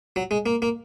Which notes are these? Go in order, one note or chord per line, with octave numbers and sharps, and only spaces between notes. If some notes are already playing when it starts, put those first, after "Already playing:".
F#3
G#3
A#3
A#3